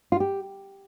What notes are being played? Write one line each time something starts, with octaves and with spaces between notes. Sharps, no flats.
F4
G4